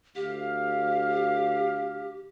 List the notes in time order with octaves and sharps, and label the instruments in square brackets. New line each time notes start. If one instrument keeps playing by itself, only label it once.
[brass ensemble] D2 F5 [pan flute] G4